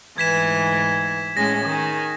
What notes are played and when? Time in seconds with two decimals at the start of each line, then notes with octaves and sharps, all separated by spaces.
0.18 D2 G#2 E3 G#6 B6 E7
1.37 A2 G#3 C#4 A#6
1.66 D#3 G#4